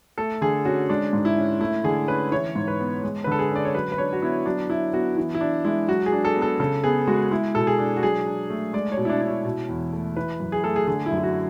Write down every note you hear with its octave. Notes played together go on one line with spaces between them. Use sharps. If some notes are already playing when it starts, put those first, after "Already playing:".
A3 A4
D3 G#4
C#4 F#4
G#3 D4
G#2
E4
C#4
A3 E4
D3 G#4
C#4 B4
E3 C#5
G#2
B4
B3
G#3
B4
D3 A4
G#4
C#4 D5
C#5
F#3 B4
B4
D4 C#5
F#4
B3 E4
F#3 D4
D4 E4
B3 F#4
E3
E4
D4
G#3 E4
F#3 F#4
G#4
D4
A4
B3
A4
C#3 A4
B3 G#4
G#3 F#4
G#3 E4
B2 A4
G#4
D4
F#4
F#3 G#4
D4
A3
G#3 D5
C#5
B2
E4
D4
D4
E4
B2
E2
A3
E3 B4
F#2
G#4
A3 A4
G#4
D3 G#4
E4
F#2
E4
F#4